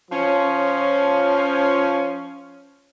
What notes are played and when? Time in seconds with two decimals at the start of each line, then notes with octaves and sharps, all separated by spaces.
0.11 F3 C#4